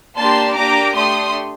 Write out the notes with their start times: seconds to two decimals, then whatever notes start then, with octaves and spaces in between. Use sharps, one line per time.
0.17 A#3 D4 G4 A5 C6
0.56 A#3 D4 G4 A#5 D6
0.95 A3 D4 G4 C6 D#6